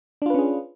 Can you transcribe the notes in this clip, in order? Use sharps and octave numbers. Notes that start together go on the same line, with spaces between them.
C#4 D4 F4 G#4 B4